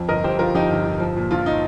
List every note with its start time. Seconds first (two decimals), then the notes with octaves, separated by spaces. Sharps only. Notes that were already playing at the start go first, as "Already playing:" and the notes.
Already playing: F2 F3
0.09 G1 A#4 D#5
0.24 G1 G4 C5
0.39 F3 F4 A#4
0.55 F2 D#4 G4
0.71 G1
0.85 G1
1.00 F3
1.16 A#2
1.31 A#1 F4
1.46 D#4